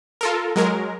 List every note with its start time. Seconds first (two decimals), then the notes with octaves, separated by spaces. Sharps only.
0.21 F4 A4 A#4
0.56 F#3 G#3 A#4